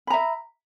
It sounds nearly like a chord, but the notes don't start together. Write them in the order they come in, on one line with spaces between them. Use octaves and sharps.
B5 A#5 E5